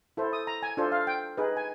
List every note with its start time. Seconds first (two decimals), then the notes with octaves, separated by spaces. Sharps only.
0.17 E4 A4 C5
0.33 D#6
0.47 A#5
0.63 G#5
0.77 D4 F4 A4 C5
0.92 F5
1.07 G5
1.37 D#4 G#4 B4
1.57 G#5